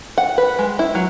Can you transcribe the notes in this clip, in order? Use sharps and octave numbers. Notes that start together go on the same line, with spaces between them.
F#5
B4
G#3
E4
F#3